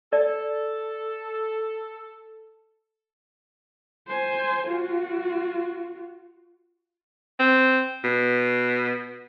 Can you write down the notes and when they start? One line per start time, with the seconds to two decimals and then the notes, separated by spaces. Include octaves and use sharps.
0.13 A4 D5
4.08 C5 G#5
4.67 F4 F#4
7.39 C4
8.04 B2